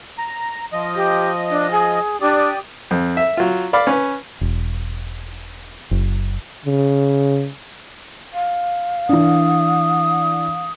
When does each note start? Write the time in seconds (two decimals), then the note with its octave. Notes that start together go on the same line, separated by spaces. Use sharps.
0.18 A#5
0.73 F3 D#5
0.95 G4
1.50 D4
1.71 G#4
2.21 D4 G4 D5 D#6
2.91 F2
3.17 E5
3.37 F#3 F4
3.73 D5 F5 B5 D6
3.87 C#4 B4
4.41 E1
5.91 F#1
6.65 C#3
8.34 F5
9.09 E3 D4 D#6